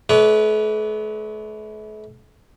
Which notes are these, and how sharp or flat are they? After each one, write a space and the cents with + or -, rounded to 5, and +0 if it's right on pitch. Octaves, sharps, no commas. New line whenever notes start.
A3 -45 B4 +0 D5 -45